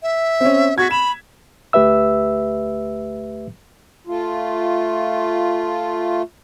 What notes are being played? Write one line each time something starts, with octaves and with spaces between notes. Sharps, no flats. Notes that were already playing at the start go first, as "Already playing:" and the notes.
E5
C4 C#4
F#4 G#6 B6
B5 E7
D2 A3 G4 B4 E5 E6
A3 F4